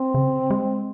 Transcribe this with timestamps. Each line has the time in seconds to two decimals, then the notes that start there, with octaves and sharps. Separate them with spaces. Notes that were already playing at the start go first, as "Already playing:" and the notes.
Already playing: C4
0.14 C#3
0.50 G#3